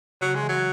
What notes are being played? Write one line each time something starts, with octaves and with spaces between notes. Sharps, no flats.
C#3 F#3
G#3
E3
F#3